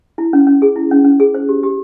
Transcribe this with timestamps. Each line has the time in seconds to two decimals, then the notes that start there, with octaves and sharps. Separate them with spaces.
0.18 E4
0.33 C#4
0.47 C#4
0.62 G#4
0.76 E4
0.91 C#4
1.04 C#4
1.20 G#4
1.34 C5
1.49 G4
1.63 G4